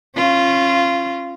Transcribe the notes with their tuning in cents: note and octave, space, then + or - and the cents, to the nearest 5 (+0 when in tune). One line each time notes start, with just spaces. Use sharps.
C#4 -30 F4 -15